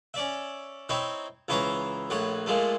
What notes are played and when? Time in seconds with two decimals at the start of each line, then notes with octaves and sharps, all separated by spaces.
0.14 C#4 D5 E5
0.89 C4 D#4 E4 C#5
1.48 C#2 E3 E4 C5 C#5 A#5
2.10 A#1 A2 C#5 F#5
2.46 A#2 F3 G#3 A3